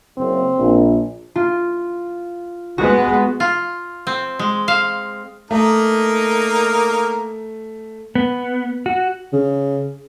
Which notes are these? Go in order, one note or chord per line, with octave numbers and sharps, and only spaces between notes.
F#1 C4
A#1
F4
G#3 B3 F#4
F4
C4
G#3
F5
A3 A#3 D#4 A#4
B3
F#4
C#3